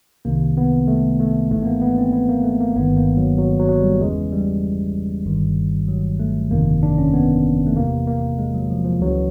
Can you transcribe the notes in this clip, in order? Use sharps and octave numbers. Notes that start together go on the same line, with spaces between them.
C2 C3 D#3 A#3
B3
A3
A3
G#1 G#2 E3 A3
B3
A#3
B3
C4
B3
A#3
A3
A#3
G1 G2 D#3 B3
A#3
F#3
F#3
F#3
F#3
G3
E2 C#3 E3 G#3
G3
G1 G2 D#3
F#3
A3
G1 F2 C3 D#3 A#3
D4
C#4
B3
A3
E2 C3 E3 A#3
A#3
G#3
F#3
F3
F3
C#2 C#3 E3 F#3